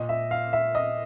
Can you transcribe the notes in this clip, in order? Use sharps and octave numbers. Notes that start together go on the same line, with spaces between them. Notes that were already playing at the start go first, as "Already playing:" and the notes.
Already playing: A#2 D#5
E5
F5
E5
D#5